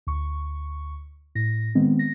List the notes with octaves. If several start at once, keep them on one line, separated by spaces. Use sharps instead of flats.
D2 C#6
A2 A#6
D#3 G#3 B3 C4
A#6